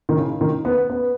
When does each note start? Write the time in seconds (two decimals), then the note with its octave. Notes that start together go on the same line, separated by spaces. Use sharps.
0.09 D#3
0.17 C#3
0.41 D#3
0.65 B3
0.90 B3